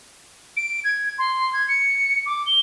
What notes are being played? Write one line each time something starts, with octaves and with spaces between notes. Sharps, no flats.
D7
G#6
C6
G#6
C#7
D6
G7